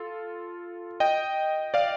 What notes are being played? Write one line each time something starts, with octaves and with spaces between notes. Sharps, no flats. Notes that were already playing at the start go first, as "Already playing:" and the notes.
Already playing: F4 A4
D#5 G5
D5 F5